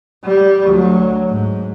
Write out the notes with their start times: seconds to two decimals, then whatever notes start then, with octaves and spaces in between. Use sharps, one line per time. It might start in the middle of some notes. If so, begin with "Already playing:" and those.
0.25 G3
0.67 D2 F#3
1.29 G#2